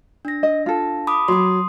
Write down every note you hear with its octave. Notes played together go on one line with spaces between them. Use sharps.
D4 A#6
D#5
F4 A4
B5 D6 D#6
F#3 C6 D#6